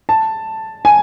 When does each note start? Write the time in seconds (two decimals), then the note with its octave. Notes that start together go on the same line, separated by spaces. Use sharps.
0.09 A5
0.85 G#5